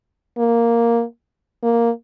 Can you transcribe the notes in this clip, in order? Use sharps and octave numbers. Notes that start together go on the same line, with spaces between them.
A#3
A#3